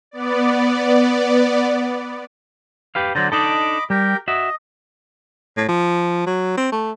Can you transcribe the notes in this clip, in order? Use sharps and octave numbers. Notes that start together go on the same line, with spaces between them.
B3 D5
G4 B4 F5
D3 F#3 C5 D5 A#5
D4 D#4 A4 D#5 B5 D6
G3 G4 A#4 G5
F#4 D#5 E5
A2
F3
F#3
C4
A3